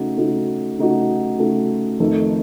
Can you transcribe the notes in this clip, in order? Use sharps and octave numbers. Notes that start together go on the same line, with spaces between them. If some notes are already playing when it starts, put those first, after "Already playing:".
Already playing: C#3 A3 D#4 F#4
C#3 A3 D#4 F#4
C#3 A3 D#4 F#4
C#3 A3 D#4 F#4
F2 D#3 A3 D#4